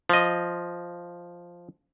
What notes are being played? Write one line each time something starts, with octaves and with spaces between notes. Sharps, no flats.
F3 D#5